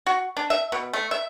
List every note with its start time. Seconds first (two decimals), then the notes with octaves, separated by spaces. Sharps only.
0.06 F#4
0.37 D4
0.50 E5
0.72 B2
0.93 A3
1.11 E5